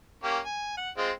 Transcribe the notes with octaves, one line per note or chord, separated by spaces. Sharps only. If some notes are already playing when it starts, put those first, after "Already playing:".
A#3 C#4 G4
G#5
F#5
G#3 C4 F4